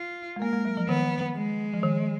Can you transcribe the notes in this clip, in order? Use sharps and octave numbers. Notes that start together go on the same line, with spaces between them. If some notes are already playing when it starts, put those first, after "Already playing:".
Already playing: F4
G#3
A#3 A#4
G#3
F#3
F3
D#3 B3
G#3
F3
D#3